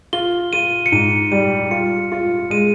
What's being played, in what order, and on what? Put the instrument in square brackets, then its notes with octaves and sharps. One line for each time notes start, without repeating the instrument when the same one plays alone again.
[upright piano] F4 [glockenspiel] G7
[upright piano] F4 [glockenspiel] D#7
[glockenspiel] C#7
[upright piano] G#2 [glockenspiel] D#7
[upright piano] G3 [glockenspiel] D#7
[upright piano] F4 [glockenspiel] C#7
[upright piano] F4
[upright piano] G#3 [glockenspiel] D#7